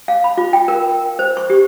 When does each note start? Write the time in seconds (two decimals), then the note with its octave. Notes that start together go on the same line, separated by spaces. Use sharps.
0.08 F5
0.24 B5
0.37 F4
0.53 G5
0.68 A#4
1.19 C5
1.37 C#6
1.50 G4